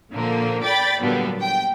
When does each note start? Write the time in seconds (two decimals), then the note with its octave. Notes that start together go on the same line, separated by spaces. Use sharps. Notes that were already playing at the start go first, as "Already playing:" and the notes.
0.13 A#2 D3 F3 A#3
0.63 D5 G5 B5 A6
1.01 A#2 D3 F#3 G3 B3
1.41 G5